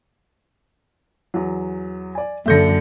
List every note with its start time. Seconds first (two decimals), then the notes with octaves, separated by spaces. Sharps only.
1.34 E2 F#3
2.15 D5 G#5
2.46 F#2 D3 A#3 A4 E5 G6 A#6 C#7